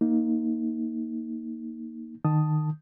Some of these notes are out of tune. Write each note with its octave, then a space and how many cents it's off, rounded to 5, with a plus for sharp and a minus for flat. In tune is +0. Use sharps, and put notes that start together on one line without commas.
A#3 +5 D#4 +15
D#3 -25 A5 +0 D#6 +0